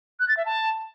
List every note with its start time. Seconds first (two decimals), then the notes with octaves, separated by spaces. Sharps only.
0.20 F#6
0.28 A6
0.37 E5
0.46 A5